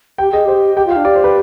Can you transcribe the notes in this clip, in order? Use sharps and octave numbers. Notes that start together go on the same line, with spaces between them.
G4 G5
G#4 D#5
G4 C5
G4 G5
F4
F5
D4
G4 D5
C5
B4